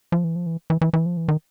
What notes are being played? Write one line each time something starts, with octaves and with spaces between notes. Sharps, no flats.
F3
E3
F3
E3
E3
E3
E3
F3
E3
D#3